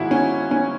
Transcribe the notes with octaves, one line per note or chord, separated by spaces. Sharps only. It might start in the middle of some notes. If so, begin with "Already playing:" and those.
Already playing: G#1 G#2 G#3 E4 F#4 G#4
C#4
C#4